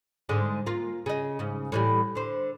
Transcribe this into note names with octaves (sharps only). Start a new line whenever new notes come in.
G#2 D3 G#3
A#3 F4
C#3 D#5
G#2 C#3
A2 E3 G3
D3 C5